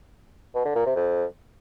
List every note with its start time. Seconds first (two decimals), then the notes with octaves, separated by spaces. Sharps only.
0.55 B2
0.65 D3
0.75 A#2
0.86 C3
0.96 F2